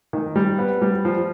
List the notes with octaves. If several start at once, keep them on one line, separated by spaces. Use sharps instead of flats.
D#3
G3
B3
G3
F3